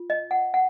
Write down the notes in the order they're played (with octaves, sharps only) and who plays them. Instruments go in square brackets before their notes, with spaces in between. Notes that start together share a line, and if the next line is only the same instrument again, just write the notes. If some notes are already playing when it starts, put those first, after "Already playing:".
Already playing: [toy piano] F4
D#5
F#5
F#5